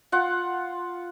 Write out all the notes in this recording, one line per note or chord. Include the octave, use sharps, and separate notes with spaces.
F4 F#5